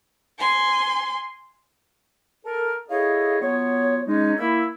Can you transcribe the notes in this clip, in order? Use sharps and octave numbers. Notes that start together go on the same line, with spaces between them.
G#5 C6
A4 A#4
E4 G#4 A4 C#5 D#5 F5
F#3 B3 F4 C#5
G#3 C#4 D#4
A#3 E4 E6